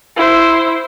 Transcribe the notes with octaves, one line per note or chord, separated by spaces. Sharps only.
E4 C5